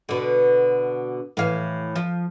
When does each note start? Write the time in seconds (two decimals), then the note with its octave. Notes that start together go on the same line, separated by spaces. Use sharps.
0.09 B2 D3
1.37 A2 E3 F5
1.96 F3